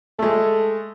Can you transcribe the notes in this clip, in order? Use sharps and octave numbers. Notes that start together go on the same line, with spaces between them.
G#3 A3 A4